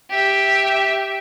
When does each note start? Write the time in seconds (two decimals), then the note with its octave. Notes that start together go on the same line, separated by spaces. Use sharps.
0.10 G4 E5